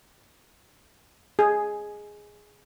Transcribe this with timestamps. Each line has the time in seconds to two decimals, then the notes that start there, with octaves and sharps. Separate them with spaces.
1.39 G#4